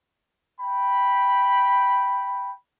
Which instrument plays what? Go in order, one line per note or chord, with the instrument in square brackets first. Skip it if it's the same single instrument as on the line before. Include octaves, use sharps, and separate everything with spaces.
[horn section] G5 B5